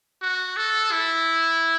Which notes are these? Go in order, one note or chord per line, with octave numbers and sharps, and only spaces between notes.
F#4
A4
E4